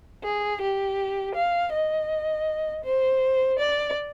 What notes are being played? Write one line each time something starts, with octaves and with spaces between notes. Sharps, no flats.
G#4
G4
F5
D#5
C5
D5